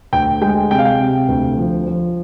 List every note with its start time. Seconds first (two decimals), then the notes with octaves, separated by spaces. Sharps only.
0.13 D2 G5
0.41 G#3 G5
0.71 C3 G5
0.79 F5
0.85 G5
1.00 C3
1.28 D2
1.57 F3
1.86 F3